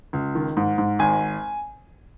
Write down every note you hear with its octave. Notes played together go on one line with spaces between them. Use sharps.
C#2
D#3
G#2
G#2
G#1 G#5